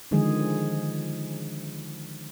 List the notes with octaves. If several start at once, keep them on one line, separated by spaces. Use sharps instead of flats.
D3 D#3 F3 G#3 G#4